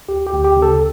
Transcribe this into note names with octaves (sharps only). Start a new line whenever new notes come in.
D2 G4
G4
D2
G4
C#3
A4